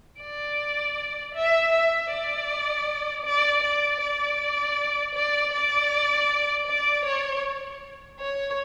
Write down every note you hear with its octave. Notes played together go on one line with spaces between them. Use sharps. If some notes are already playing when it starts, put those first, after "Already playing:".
D5
E5
E5
D5
D5
D5
D5
D5
D5
D5
C#5
C#5